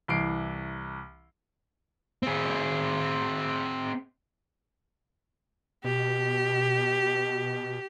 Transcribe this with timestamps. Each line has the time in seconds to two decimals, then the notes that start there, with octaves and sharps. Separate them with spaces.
0.08 C2 E3 C7 D7
2.23 C4 G#4
5.84 B2 G4